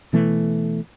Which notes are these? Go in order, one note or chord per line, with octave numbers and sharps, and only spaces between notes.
B2 E3 A3